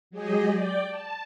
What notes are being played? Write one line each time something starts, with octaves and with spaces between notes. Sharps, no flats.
F#3 G#3 G4 G#4 D#5
D5 G5
A5